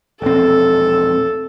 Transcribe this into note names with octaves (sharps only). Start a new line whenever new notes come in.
E1 A#1 C4 A4